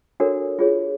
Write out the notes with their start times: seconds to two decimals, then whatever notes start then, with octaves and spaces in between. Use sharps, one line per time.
0.20 D4 F#4 A4 A#4 C#5
0.59 F4 G#4 C#5